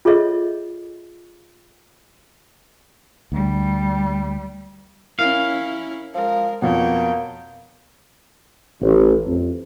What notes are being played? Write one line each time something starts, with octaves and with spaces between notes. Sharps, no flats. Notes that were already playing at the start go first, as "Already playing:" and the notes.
F4 G#4 A4 C#5 D#5 E5
D2 G3
C#4 E4 A#4 F5
F3 G#3 A#4
F2 B2 A#3 C#5 G5
A1
F2